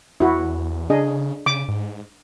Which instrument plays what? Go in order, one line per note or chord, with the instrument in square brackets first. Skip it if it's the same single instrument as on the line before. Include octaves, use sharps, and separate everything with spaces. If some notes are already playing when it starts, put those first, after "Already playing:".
[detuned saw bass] E2 [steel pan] E4 F#4
[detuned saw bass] C#3 [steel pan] D4 G#4 D#5
[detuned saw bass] C#3 [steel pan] D6
[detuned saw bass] G#2